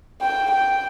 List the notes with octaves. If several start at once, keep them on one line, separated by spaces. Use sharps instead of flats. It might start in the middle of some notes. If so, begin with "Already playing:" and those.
G5
G5